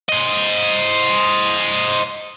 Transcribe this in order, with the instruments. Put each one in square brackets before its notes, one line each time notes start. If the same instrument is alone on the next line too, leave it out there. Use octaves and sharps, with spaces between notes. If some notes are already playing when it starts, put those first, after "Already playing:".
[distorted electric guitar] C5 D#5